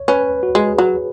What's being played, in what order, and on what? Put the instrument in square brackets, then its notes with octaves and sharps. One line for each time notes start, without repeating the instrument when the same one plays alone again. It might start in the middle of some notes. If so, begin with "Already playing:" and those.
Already playing: [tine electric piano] C#5
[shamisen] C#4 [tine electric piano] B4
[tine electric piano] F#4
[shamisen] G#3 [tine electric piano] G#4
[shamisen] F#3